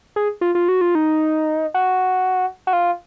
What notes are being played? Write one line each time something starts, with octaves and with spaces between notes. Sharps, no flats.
G#4
F4
F4
F#4
F4
D#4
F#4
F#4
F4